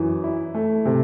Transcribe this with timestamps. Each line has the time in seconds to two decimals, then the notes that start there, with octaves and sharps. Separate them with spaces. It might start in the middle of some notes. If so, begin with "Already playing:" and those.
Already playing: F#2 E3
0.24 E4
0.54 A3
0.86 C3